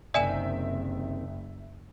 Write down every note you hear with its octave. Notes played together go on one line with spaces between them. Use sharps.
F#1 C3 D#3 D5 E5 G#5 E7